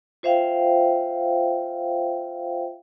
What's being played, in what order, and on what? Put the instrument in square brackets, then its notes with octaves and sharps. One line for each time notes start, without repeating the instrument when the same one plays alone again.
[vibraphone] F4 C5 E5 F5 G5